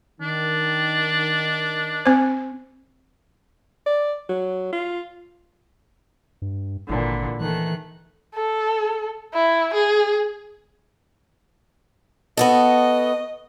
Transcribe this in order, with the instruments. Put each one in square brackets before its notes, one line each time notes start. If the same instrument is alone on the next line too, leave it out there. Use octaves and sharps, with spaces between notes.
[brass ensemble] D#3 [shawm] D4
[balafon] C4 C5
[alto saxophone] D5
F#3
F4
[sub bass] G2
[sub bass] G#1 [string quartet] A#2 D3 E3
[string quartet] D#3 A3 F#6 [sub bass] E3
[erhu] A4
E4
G#4
[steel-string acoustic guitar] B3 F#4 A4 [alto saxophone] D#5